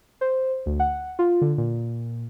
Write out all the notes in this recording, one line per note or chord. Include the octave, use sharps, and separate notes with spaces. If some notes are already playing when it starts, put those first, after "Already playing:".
C5
D2
F#5
F4
D3
A#2